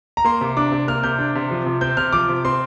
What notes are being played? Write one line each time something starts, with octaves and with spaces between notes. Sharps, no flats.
A#5
A#3 C6
C3
D4 D6
C3
A#3 F6
C3 G6
D4
C3
F3
C3
C4 G6
C3 F6
F3 D6
C3
C4 C6